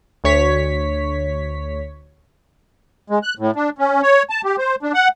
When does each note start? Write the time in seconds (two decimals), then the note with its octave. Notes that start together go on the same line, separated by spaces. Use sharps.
0.24 D2 C#5 B6
3.10 G#3
3.23 F#6
3.39 A2
3.56 D4
3.79 C#4
4.03 C#5
4.30 A5
4.45 G4
4.58 C5
4.83 D4
4.94 F#5